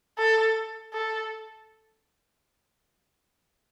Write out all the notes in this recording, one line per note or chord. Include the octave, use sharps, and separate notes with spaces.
A4
A4